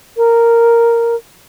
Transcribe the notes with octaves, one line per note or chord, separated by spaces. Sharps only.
A#4